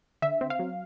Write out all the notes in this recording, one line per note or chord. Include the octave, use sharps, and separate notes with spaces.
D3 E5
C4
F5
F#3